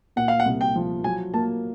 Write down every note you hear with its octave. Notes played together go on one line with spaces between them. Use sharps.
A#2 F#5
F5
F#5
C2
G5
F3
F#3 G#5
A#3 A5